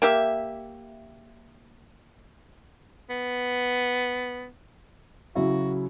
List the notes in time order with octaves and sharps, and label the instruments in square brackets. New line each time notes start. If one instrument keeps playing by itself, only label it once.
[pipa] A#3 G4 E5
[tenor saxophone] B3
[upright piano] C#3 F#3 E4 [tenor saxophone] F#4